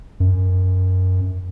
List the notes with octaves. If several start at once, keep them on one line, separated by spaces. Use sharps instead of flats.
F#2